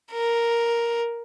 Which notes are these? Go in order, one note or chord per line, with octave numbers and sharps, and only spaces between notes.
A#4